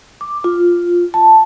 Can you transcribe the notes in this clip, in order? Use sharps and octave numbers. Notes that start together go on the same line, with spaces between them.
D6
F4
A5